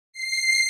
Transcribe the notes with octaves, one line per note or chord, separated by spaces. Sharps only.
C7